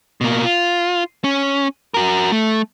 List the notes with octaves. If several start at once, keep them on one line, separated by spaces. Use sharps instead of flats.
B2 A#3
F4
C#4
F#4 A#4
A3